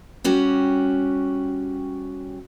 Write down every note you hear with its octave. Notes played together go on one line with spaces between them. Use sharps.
G3 C#4 F#4 G4